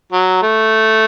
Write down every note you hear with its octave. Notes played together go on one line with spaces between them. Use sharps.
F#3
A3